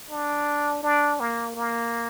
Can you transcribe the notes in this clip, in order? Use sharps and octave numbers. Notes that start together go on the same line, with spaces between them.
D4
D4
A#3
A#3